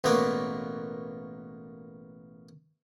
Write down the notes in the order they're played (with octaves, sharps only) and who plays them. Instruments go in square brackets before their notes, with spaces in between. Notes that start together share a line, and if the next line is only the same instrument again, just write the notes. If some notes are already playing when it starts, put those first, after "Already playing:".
[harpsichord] A1 B2 A#3 B3 C#5 D5